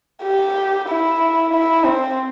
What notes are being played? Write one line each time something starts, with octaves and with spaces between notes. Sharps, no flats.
G4
E4
E4
C4